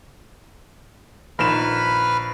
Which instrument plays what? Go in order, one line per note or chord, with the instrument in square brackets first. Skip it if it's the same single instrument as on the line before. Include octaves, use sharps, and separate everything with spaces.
[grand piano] A#1 D#3 E7 [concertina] B4 B5 F6